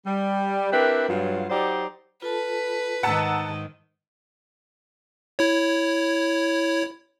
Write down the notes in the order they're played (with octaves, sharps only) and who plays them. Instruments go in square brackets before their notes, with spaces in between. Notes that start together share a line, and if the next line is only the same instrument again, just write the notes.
[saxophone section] G3
C4 D4 E4 G4 A#4 B4
G2 F#3 F4
F#3 D#4 G4 C5 D5
[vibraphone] F4 A4 A5 [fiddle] B4
[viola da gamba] G#2 D#3 [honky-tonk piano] F#5 A5 [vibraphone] A#5 E6
[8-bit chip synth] E4 C#5